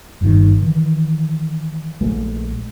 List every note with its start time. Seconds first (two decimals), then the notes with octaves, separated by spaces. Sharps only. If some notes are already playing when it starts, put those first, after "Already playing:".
0.21 G1 G2 A#2 D#3
0.62 D#3 E3
2.01 A#1 G#3 A3